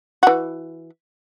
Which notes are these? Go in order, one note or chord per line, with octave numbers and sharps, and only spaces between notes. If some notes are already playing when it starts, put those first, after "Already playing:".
E3 F#4